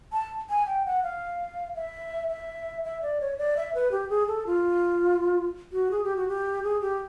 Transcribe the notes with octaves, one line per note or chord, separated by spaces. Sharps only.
A5
G#5
G5
F#5
F5
E5
E5
E5
D5
C#5
D5
E5
B4
G4
G#4
A4
F4
F#4
G#4
G4
F#4
G4
G#4
G4